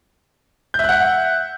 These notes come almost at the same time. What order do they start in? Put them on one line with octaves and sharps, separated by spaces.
G6 E5 F#6 F#5